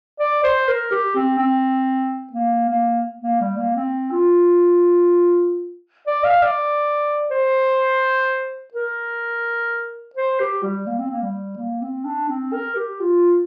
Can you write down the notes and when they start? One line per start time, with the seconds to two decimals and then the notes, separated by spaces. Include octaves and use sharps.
0.20 D5
0.44 C5
0.68 A#4
0.91 G4
1.15 C4
1.38 C4
2.33 A#3
2.69 A#3
3.22 A#3
3.41 G3
3.57 A#3
3.76 C4
4.11 F4
6.07 D5
6.24 F5
6.42 D5
7.31 C5
8.74 A#4
10.16 C5
10.40 G4
10.63 G3
10.87 A#3
10.99 C4
11.11 A#3
11.22 G3
11.58 A#3
11.82 C4
12.05 D4
12.29 C4
12.53 A#4
12.76 G4
13.00 F4